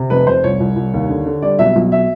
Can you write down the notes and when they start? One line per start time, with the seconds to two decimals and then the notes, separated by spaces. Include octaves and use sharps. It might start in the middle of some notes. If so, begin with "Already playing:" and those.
Already playing: C3
0.10 F1 B4
0.27 F1 C5
0.44 C2 C#5
0.60 C2
0.76 C2
0.94 D#2
1.10 D3
1.26 D3
1.42 G3 D5
1.59 B1 E5
1.76 B1
1.92 E5